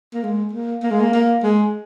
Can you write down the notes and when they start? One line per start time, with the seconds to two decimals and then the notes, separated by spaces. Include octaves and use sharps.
0.14 A#3
0.24 G#3
0.53 A#3
0.83 A#3
0.91 G#3
1.00 A#3
1.13 A#3
1.43 G#3